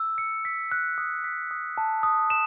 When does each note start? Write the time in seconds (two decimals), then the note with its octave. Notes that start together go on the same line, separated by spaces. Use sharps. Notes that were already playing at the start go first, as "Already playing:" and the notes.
Already playing: E6
0.18 C#7
0.45 B6
0.72 F#6
0.98 D#6
1.24 B6
1.51 D#6
1.78 A5
2.03 D#6
2.30 E7